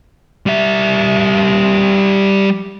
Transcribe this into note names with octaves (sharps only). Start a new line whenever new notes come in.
G3 E5